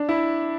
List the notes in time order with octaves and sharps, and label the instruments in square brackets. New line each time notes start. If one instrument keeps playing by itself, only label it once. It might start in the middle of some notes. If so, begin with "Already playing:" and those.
Already playing: [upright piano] D4
E4